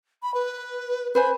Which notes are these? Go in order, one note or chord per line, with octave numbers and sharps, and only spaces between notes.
B5
B4
B4 C5 G#5 B5